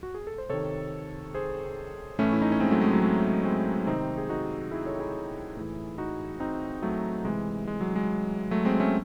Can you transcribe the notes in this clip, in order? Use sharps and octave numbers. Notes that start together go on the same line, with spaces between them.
F#4
G#4
A4
C5
C3 D#3 A4 C#5
G#4 C5
A2 E3 A3 C#4
E4
D#4
C#4
G#3 C4
F#3 A3
G#3
F#3
G#3
G#3 C4
C3 D#3 C4 D#4
G#4
D#4 F#4
E4 G#4
A4 C#5
E4 G#4
A2 E3
D#4 F#4
C4 D#4
F#3 A3
C3 E3 G#3
G#3
F#3
G#3
F#3 A3
G#3 C4
A3 C#4